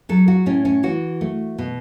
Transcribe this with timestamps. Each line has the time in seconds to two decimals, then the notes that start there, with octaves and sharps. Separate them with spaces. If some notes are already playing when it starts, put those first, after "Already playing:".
0.09 F#3 A4
0.28 F#4
0.46 A2 C#4
0.65 C#4
0.83 E3 F#4
1.21 A3
1.58 B2